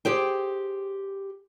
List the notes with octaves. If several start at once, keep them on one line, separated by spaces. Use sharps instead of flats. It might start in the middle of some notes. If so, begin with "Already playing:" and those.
G4 G#4 C5 G5